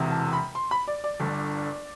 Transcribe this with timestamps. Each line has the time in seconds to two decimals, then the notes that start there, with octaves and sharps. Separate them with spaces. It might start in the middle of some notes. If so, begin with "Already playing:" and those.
Already playing: E1 E2 C3
0.11 A5
0.33 B5
0.55 C6
0.71 B5
0.88 D5
1.04 D5
1.20 G1 G2 D3